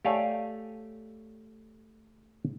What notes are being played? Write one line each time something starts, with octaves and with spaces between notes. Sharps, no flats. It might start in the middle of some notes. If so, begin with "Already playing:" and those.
A3 G4 C#5 D5 F5 G#5